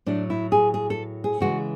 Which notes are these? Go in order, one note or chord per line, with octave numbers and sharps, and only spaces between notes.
A2 F#3 A3 D4
E4
G#4
G#4
A4
G#4
C#3 E3 G#3 F#4